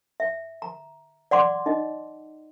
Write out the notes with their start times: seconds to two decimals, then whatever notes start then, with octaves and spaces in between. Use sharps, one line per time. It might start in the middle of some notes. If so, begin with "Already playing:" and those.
0.20 E5
0.62 A#5
1.31 D5 F#5 C6 D6
1.66 D#4 D#5